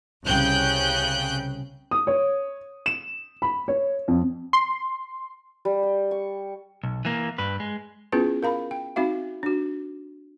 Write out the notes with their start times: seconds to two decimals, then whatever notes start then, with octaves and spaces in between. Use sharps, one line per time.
0.25 C2 C#3 G5 F#6 G6
1.91 D#6
2.07 C#5
2.86 E7
3.42 B5
3.68 C#5
4.08 F2
4.53 C6
5.65 G3
5.83 G5
6.11 C#6
6.83 B1
7.05 E3 A#3
7.38 G2 B4
7.60 G#3
8.12 B3 C#4 E4 F4 G#4 B4
8.43 A#4 F5 A#5 B5
8.71 G5
8.96 C4 D#4 F#4 E5 F5
9.43 D4 F#4